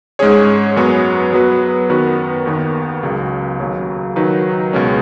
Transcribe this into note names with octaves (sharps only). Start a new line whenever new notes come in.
G#2 G#3 C#4 G#4 C#5
F#2 F#3 B3 G#4 C#5
F#3 B3 F#4 B4
F#2 D#3 B3 F#4 B4
D#2 D#3 B3
C#2 C#3 F#3
D#2 C#3 F#3
D#3 F#3 D#4 B4
C#2 B2 G#3 C#4